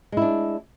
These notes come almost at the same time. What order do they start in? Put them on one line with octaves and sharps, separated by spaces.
G#3 E4 D4